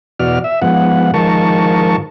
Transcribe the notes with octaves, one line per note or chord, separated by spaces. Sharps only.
E2 B2 F#4 D5 F6
E5
G#2 F3 B3 F#5
G#2 D#3 F3 A#4 A5 C#6